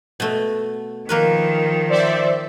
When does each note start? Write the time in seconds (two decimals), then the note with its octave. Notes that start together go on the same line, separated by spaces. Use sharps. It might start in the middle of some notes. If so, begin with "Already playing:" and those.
0.20 B2 A3
1.09 D#3 F3 A#3 A#4 B4
1.89 C5 D5 E5